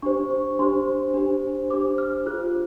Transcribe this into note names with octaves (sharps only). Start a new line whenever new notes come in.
D4 G4 C5 C#6
C#6
D4 G4 C5 C6
D4 G4 C5
D4 G4 C5 D6
F6
F4 G#4 C5 F#6